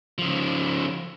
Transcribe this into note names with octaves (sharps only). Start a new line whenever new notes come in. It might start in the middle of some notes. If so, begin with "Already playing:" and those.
C#3 F3